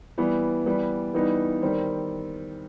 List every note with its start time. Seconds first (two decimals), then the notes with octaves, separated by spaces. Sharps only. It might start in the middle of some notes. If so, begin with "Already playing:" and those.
0.18 E3 G3 B3
0.66 E3 G3 B3
1.14 E3 G3 B3 D#4
1.62 D#3 G3 C4